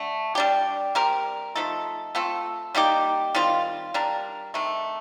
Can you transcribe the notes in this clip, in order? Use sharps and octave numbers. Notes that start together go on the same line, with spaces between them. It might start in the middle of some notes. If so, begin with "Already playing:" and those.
Already playing: D3 A3
G3 D4 G4
G3 C4 G4 A#4
F3 A3 D#4 A4
A3 C4 F4 A4
G3 A#3 D#4 G4
D#3 G3 C4 F4
G3 D4 G4 A#4
C3 D#3 A3